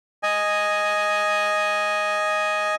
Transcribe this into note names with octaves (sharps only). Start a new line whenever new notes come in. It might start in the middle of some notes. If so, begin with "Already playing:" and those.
D#5 G#5